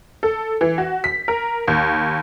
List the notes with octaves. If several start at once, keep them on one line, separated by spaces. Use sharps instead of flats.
A4
E3
F#4
B6
A#4
D#2